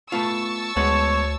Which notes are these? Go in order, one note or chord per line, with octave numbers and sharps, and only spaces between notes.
A3 B3 F4 A5 C#6 E6
D2 G#3 B3 C#5 F#5